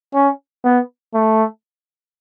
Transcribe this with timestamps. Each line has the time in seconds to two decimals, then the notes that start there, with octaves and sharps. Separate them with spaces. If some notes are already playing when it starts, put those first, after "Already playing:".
0.14 C#4
0.64 B3
1.14 A3